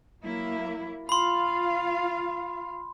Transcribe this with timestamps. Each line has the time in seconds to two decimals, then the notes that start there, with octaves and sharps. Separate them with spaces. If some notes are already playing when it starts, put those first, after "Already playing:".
0.24 F#3 A#3 E4
1.09 F4 F5 B5 C6